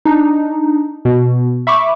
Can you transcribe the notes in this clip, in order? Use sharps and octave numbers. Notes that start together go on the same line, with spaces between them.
D4 D#4
B2
E5 B5 C#6 D6